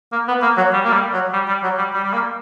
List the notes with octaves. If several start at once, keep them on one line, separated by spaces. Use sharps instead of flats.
A#3
B3
A#3
F#3
G3
A#3
G3
F#3
G3
G3
F#3
G3
G3
G3
A#3